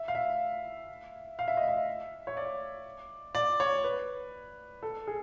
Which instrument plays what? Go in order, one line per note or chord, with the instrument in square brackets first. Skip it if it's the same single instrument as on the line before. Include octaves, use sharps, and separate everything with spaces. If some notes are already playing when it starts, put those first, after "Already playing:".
Already playing: [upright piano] E5
F5
E5
F5
E5
D#5
E5
C#5
D5
D5
C#5
B4
A4
G#4